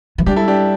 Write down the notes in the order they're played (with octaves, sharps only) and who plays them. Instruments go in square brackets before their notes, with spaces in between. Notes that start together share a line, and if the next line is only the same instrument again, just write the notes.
[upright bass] E3
[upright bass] G3 [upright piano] D4 G4
[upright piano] E4 A4
D4 G4